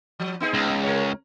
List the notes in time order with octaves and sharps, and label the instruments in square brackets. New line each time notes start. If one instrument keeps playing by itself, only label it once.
[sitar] F3
B3 D#4 G#4
[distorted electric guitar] C#2
[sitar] A#4 C#5